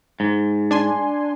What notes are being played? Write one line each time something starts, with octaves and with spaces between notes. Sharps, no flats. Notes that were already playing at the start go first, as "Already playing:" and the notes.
G#2
D4 G#5 C6